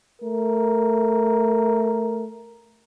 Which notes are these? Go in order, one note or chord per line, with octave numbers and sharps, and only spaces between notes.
A3 A#4